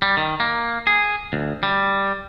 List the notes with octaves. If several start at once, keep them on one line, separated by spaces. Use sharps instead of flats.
G3
D#3
A#3
G#4
D2
G3